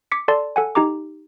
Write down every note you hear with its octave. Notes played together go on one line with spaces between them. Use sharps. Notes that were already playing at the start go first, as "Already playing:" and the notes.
D6 B6 C#7
A4 D5 A5 C6
A4 F#5 G#5
D#4 G4 A#5 D6